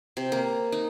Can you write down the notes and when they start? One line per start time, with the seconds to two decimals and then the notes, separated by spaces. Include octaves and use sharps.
0.17 C3
0.32 A#3
0.72 D#4